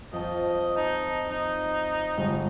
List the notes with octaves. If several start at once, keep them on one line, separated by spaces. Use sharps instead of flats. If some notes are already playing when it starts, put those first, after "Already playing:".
F2 D#5 A5
D#4 A5
D#4
G1 G#3